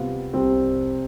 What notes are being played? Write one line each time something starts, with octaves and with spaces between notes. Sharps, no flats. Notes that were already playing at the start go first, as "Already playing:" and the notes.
Already playing: C3 G3 B3 F4
C2 C3 G3 C4 G4